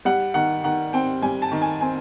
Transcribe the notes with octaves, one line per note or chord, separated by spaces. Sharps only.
G3 F#5
D#3 F#5
D#3 F#5
C4 G5
G3 G#5
A5
D#3
G#5
C4 G#5